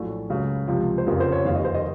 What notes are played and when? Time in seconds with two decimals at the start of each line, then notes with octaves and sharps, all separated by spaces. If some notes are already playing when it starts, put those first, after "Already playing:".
Already playing: A#1 A2 F#3 A4
0.30 C#2 C#3 F#3
0.68 C#2 C3 F3
0.98 C5
1.06 F1 F2 C#3 F3 A#4
1.20 C5
1.32 C#5
1.45 F1 D#2 D#3 F5
1.55 D#5
1.65 C5
1.74 D#5